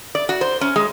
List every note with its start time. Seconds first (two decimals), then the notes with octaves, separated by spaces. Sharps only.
0.15 D5
0.29 F#4
0.41 C5
0.61 C#4
0.76 G#3